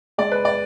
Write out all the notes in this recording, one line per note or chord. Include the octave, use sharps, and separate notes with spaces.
G#3 D5
B4
D5